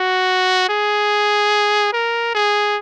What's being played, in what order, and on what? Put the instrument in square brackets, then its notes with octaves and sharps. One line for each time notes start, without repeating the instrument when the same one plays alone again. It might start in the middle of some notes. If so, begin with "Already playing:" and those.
Already playing: [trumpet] F#4
G#4
A#4
G#4